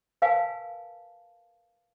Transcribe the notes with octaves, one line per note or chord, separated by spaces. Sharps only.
A#4 B4 F5 G#5 A5